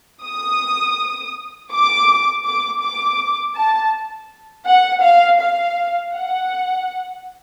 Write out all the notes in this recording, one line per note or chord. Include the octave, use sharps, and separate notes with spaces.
D#6
D6
D6
D6
A5
F#5
F5
F5
F#5